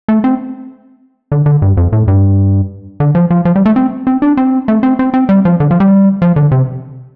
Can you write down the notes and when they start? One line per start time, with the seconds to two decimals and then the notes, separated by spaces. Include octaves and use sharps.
0.08 A3
0.24 C4
1.32 D3
1.46 D3
1.62 G2
1.77 F2
1.93 A2
2.08 G2
3.00 D3
3.15 F3
3.30 F3
3.45 F3
3.56 G3
3.66 A3
3.76 C4
4.07 C4
4.22 D4
4.37 C4
4.68 A3
4.83 C4
4.99 C4
5.14 C4
5.29 G3
5.45 F3
5.60 D3
5.71 F3
5.80 G3
6.22 F3
6.36 D3
6.52 C3